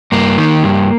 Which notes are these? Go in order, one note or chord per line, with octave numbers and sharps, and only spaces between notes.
G2 A#3
D#3
G2